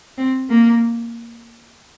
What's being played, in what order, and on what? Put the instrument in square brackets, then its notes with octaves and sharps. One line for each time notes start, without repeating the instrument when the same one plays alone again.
[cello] C4
A#3